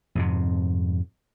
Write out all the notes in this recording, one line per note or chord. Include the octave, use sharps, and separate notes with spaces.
F2 G#2 C3